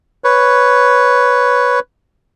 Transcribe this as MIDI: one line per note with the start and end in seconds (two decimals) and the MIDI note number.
0.24 1.80 71
0.24 1.80 73